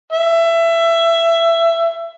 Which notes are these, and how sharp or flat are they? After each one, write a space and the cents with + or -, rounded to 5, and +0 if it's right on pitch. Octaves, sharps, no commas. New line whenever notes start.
E5 +20